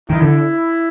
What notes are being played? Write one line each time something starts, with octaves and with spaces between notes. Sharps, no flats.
D#3 E4
D3